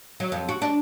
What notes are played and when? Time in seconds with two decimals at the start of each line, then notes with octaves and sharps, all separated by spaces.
0.20 F#3
0.32 F2
0.49 F#4
0.62 D4